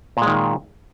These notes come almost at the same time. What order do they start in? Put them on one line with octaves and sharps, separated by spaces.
A#2 G#3 D#3